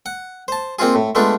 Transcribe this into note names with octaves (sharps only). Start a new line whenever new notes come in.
F#5
C5 A5
A#3 C4 D#4 F4 G#4
A2
G#3 A3 B3 D4 F4